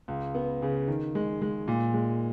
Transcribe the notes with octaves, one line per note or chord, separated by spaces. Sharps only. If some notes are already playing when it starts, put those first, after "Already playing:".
C#2
B3
C#3
D#3
G#3
G#3
A#2
G#3